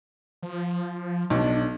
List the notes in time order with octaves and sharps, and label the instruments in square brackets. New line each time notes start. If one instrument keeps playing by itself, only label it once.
[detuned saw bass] F3
[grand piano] B1 [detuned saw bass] D4